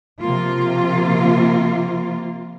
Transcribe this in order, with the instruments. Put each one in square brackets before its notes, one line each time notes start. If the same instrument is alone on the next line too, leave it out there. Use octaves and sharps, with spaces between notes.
[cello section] C3 F3 A#3 F4